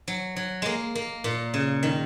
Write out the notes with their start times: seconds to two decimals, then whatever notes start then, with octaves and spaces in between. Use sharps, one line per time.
0.08 F#3
0.36 F#3
0.62 G#3 A#3
0.95 A#3
1.24 A#2
1.54 C#3
1.83 D#3